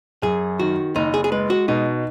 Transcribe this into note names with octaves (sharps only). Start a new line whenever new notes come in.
F#2 G#4
D#3 F#4
F#1 D#4
G#4
G#4
G#3 B4
F#4
B2 D#4